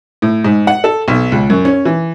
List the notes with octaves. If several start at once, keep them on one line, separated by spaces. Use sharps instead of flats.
A2
G#2
F#5
A4
B1
C#2
F#2
C#4
E3